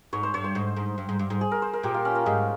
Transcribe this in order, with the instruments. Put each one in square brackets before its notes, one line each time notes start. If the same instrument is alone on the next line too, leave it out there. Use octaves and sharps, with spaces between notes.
[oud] G#2 [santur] C#5
[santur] C5
[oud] G2 [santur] C#5
[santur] C5
[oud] G#2
G#2
G2
G#2
G2
G#2
[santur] G#4
A#4
C5
A#4
[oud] A#2 [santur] G4
[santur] F4
C#4
A#3
[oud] G#2 [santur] G#3